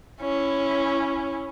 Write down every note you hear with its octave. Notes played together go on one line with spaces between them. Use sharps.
C#4 E4